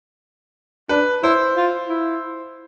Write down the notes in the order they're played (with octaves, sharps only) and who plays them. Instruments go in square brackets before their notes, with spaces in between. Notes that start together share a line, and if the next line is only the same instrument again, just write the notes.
[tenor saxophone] D4 [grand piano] B4
[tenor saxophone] E4 [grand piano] C5
[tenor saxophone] F4
E4